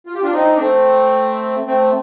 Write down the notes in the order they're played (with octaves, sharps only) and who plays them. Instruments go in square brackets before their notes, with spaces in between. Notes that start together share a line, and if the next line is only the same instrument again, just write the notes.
[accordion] F4
G4
D4 F4
C4 D#4
D4
A3 C4
A3 C4